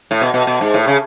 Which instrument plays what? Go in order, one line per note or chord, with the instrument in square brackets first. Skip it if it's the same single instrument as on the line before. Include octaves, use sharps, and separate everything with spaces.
[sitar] A2
B2
B2
B2
G#2
A2
C#3